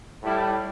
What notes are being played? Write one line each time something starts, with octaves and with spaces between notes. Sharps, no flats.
A2 G3 E4